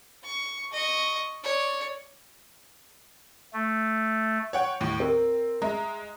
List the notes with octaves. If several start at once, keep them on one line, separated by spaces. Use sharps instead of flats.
C#6
D#5 C#6
C#5 D5
A3
C#5 F#5 G5
D#2 A2
C4 A#4
G#3 E5 A#5